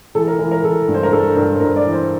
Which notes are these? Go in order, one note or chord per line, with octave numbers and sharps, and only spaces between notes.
E3 A4
A#4
E3 A#4
A#4
E3 A4
G2
C5
A#4
G2 A4
G2 A#4
C5
G2 A#4
D5
E3
C5